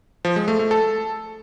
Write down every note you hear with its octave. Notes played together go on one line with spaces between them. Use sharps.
F3
G#3
A3
A3
A4